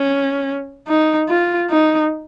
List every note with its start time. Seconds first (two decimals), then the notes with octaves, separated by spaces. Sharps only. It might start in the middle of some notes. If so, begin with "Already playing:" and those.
Already playing: C#4
0.88 D#4
1.29 F4
1.70 D#4